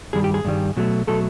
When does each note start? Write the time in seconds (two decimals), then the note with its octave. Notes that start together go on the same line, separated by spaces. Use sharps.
0.13 G2 D#3 G3 G#4
0.24 G4
0.34 G#4
0.45 G2 D#3 G3
0.77 B2 F#3 A3
1.07 B2 F#3 A3 A4